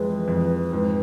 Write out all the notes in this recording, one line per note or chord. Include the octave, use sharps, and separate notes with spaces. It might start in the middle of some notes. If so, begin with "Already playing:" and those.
Already playing: F2 E3 G#3 B4
F2
G#2